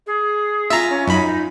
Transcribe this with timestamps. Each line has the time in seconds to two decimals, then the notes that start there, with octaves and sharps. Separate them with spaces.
0.07 G#4
0.70 F4 E5 G#5 A#5
0.89 C#4
1.07 F#2 D#4 B5